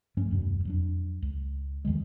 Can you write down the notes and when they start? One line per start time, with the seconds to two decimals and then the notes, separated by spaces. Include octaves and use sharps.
0.17 G2 F3 A3 C#4
0.31 D#1 F#2 B2
0.65 F2 F#3 D4
1.22 C#2
1.85 E2 D#3 F3 G#3